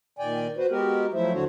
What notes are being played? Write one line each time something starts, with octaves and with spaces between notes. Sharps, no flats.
A#2 D#3 D5 G5 G#5
F#4 B4 C5
G#3 B3 F#4 G4 A#4
F3 F#3 A3 E4 C5 E5
D#2 D3 D4 F#4 C5 C#5